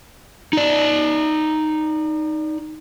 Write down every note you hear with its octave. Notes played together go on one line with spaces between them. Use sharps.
D#4 D5